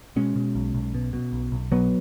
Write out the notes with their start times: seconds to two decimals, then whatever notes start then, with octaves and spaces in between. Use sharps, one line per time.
0.16 B2 G#3 C#4
0.36 B2
0.55 B1
0.75 B1
0.95 B2
1.13 B2
1.33 B1
1.52 B1
1.72 B2 F#3 B3